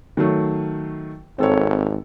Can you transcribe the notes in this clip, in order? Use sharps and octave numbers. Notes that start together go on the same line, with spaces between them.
D#3 F#3 A3
G#1 C4 A4 C#5